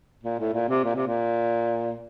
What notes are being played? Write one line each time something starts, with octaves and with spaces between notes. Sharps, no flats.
A#2
A2
A#2
C3
A#2
C3
A#2